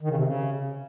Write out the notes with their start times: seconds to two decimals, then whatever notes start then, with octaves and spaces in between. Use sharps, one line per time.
0.01 D#3
0.09 C#3
0.17 C3
0.25 C#3